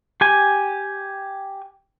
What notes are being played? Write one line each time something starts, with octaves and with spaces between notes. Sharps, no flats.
G4 G#5